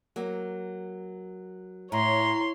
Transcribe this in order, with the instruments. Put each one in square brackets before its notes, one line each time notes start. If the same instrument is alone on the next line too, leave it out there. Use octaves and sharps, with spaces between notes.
[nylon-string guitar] F#3 A#3
[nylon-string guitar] A2 [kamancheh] C#5 C6 [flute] A#5